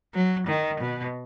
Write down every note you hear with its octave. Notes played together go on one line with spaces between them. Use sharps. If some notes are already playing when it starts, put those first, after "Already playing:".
F#3
D#3
B2